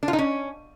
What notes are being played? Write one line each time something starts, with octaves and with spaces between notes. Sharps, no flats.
D4
F4
D#4
C#4